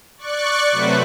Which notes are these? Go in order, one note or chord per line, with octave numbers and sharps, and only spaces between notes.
D5 C#6 F#6
C3 F#3 A3 B4 C5